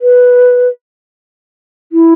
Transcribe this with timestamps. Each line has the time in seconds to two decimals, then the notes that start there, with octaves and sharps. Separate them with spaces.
0.01 B4
1.92 E4